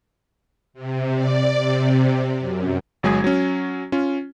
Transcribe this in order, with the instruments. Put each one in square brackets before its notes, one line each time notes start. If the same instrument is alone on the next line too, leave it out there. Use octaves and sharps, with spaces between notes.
[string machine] C3
D5
C3
F#2
[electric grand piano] G1 F#3 G#3 G#4 D#6 G#6
F#3 C#4
C#4 F4